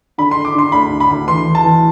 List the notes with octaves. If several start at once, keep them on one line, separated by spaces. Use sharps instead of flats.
D3 B5
D3 C6
D6
D3 C6
D2 B5
D3
B5
D2
E3 C6
E3
A5
E3